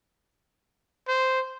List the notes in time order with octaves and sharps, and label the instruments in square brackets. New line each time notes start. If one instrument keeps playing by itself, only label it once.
[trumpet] C5